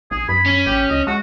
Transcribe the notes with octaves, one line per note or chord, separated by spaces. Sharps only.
A#1 G#4
F#2 B5
C#4
A1 G4
C#2 D#5
G#3 F#4